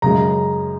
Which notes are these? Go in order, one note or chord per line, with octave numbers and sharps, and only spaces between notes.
F#2 C#3 G#3 A#5